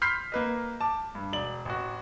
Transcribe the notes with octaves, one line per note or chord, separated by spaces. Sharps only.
B5 C6 F6 G6 B6 C7
A#3 B4 D#5
A5 D6
G2
E1 D5 F#7
A1 F#4